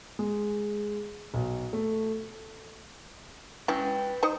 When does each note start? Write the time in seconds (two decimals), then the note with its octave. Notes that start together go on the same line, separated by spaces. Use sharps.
0.19 G#3
1.34 B1
1.73 A3
3.68 C#4 E4 B4 G5
4.23 D#4 C5 D#5